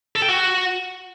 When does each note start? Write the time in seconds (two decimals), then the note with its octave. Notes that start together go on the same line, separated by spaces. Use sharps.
0.16 A4
0.22 G5
0.29 F#4